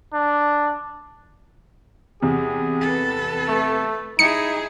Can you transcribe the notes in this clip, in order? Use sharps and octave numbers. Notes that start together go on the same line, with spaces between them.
D4
E2 C3 G#4
A4 B4
A3
D#4 E4 G#4 C#7